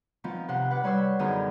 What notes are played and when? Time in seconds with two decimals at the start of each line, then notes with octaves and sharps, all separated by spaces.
0.24 D#3 F3 B3 C4
0.48 C3 F#5 C6
0.71 B4 F#5 D6
0.83 G3 B4 C#5 B5 C6 E6
1.19 F#2 D3 D#3 B3 G#4 E6